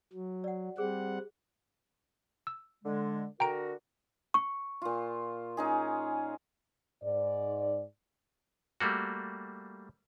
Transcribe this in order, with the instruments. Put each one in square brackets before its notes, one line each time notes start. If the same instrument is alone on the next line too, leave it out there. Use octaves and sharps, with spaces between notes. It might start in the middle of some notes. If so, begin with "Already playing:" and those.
[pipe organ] F#3
[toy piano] D5 F#5
[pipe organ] G3 C4 F#5 [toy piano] G#4
[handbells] E6
[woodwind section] D3 G#3
[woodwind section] D3 F#4 A#4 [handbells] G5 A#5 D7
[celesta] C#6
[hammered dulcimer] A#2 F4
C#4 D#4 G#4
[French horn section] G#2 D5
[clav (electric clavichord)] G3 A3 A#3 F#4